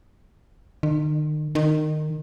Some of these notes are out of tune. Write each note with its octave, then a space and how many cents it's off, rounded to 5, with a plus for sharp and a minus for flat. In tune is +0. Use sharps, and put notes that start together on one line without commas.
D#3 -40
D#3 -20